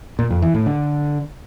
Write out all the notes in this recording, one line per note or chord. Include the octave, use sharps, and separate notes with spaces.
A#2
F2
E3
A2
D3